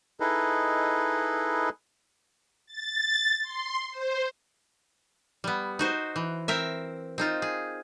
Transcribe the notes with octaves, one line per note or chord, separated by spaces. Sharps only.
D#4 E4 G#4 A4 B4 D#5
A6
C6
C5
G3 B3
D#4 F#4 C5
E3
C4 A#4 E5
C4 D#4 F4
G#4